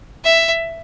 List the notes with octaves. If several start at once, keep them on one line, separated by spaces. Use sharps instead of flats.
E5